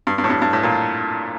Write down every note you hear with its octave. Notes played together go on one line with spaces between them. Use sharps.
G2
G2
A2
G2
G2
A2
A#2